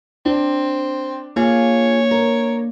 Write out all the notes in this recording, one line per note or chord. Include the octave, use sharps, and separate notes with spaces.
C4 D4
A#3 F4 G#4 C#5
A#4